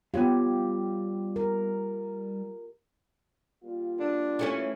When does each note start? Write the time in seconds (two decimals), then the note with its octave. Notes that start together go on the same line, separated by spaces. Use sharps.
0.14 G3 B3 F4 G4 C#5 F5
1.36 A#4
3.63 G3 A#3 F4
3.99 D4
4.39 E3 A3 C#4